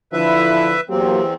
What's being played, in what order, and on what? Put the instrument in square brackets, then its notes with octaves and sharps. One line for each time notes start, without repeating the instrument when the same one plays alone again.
[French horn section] D3 F3 E4 [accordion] B4 E5
[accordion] E2 C4 [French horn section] F#3 A#3 G4